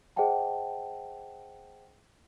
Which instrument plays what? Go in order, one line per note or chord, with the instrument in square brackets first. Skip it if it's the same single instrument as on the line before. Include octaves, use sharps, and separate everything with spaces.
[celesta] G#4 C5 D#5 F#5 G5 A5